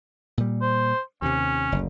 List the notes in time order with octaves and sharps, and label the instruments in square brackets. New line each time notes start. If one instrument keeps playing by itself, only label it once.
[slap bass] A#2 G3
[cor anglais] C5
[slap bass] D#2 C3 [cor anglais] C#4
[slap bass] F#1 D2